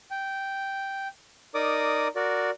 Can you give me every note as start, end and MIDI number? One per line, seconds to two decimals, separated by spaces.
0.11 1.08 79
1.55 2.08 63
1.55 2.08 70
1.55 2.08 74
1.55 2.08 86
1.55 2.08 87
2.16 2.50 66
2.16 2.50 70
2.16 2.50 74